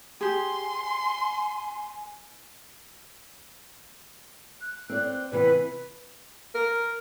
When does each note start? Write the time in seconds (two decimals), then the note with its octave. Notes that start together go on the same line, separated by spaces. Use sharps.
0.21 G4 G#4 G#5 C6
4.61 F#6
4.90 C4 D5
5.32 C3 E3 B3 B4
6.55 A#4